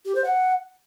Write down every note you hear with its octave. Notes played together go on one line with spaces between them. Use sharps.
G4
C5
F#5